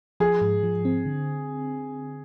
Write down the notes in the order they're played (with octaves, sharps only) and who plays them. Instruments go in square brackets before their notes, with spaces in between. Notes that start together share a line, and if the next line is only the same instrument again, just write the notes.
[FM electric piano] F3 [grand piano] G#4
[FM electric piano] G#2
F3
C4
D3